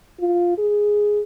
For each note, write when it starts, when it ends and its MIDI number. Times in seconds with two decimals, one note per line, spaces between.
0.20 0.53 65
0.58 1.21 68